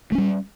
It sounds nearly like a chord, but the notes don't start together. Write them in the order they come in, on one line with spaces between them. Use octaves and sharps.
A3 C#4 G3